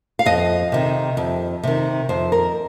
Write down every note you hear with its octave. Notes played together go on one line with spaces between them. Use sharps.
F5
F2 D#5
C3 D#3
F2
C3 D#3
F2 C5
A#4